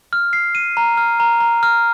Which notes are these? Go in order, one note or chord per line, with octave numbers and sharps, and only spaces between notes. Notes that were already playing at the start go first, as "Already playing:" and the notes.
F6
C7
D#7
A#5
F6
A#5
A#5
F6